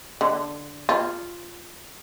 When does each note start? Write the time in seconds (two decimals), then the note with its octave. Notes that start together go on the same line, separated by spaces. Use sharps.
0.21 D3
0.89 F4